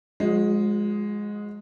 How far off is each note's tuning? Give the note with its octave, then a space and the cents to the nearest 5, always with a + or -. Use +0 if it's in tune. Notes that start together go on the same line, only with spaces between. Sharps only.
F3 +40 G#3 +0 F#4 -25